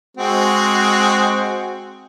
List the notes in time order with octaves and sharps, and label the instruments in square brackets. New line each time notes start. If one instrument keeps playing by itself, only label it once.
[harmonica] G#3 C4 F#4